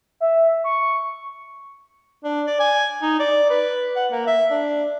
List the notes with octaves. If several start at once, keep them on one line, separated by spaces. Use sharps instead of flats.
E5
C#6
D4
D5
G#5
D#4
D5
B4
F#5
A#3
E5
D4